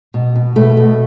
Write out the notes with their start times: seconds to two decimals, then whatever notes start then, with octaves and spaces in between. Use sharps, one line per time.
0.14 B2
0.36 B2
0.56 B2 A3
0.77 B2